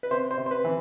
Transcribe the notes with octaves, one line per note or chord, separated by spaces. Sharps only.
B4
C3 C5
C5
C3
C5
B4
E3